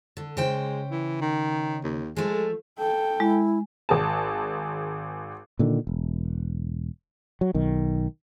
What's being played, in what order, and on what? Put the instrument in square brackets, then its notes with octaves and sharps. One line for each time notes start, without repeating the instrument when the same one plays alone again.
[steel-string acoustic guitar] D3
[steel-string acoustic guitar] C#3 C5 G5 [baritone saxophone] G#3
[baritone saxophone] E3
D#3
D#2
[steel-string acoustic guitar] F3 A3 [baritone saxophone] G#3
[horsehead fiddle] A4 G5
[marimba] G#3 [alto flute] E4
[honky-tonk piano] G#1 G#4 A5
[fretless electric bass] A#2 D3 D#3
E1
F#3
B1 D#3